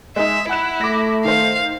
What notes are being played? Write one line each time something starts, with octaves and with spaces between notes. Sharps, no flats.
G#3 D#4 E5
E4 F#5 F#6 E7
A3 D6 A#6
D#3 C5 F5